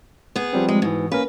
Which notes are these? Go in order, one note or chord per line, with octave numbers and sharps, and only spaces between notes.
B3 G#4
F3 G3 C4
G#3
G#2 B2 E3
A#3 C#4 A#4 B4